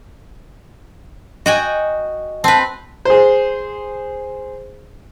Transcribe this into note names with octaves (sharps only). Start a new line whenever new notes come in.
F#4 D#5 G5 G#5
C4 B4 A5
G#4 C5